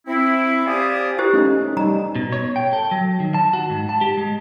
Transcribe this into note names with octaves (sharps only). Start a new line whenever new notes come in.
C4 E4
G4 C5 D5 F5 G#5 D#6
E4 G4 C5
A3 C#4 D#4
G3 D#4 A#5
B2
C#5
G5
A4
F#3
D#3
A5
F#4
G#2
A5
G4
G#3